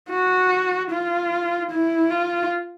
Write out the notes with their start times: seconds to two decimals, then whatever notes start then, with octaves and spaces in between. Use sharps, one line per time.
0.10 F#4
0.91 F4
1.71 E4
2.11 F4